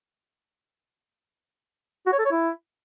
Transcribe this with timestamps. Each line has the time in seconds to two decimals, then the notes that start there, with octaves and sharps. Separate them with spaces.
2.06 F#4
2.13 C#5
2.19 A4
2.25 C#5
2.31 E4